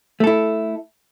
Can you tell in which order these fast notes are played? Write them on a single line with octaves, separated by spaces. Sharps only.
A3 A4 E4